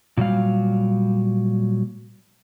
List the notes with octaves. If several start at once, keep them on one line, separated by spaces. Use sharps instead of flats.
A#2 F#3 G3 F5